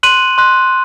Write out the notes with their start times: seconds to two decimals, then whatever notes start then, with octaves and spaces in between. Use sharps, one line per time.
0.03 C6 F#6 D#7 F#7
0.38 C6 F#6